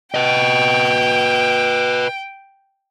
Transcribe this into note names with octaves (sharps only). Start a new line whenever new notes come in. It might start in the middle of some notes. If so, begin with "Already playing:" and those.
B4 D#5 G5